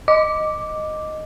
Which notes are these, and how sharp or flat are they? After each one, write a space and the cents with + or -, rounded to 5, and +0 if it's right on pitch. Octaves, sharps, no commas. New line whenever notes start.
D#5 -5 D6 +0